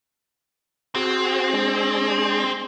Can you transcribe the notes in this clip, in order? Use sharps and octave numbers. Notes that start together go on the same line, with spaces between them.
C4 F#4 G#4
G#3 D4 G#4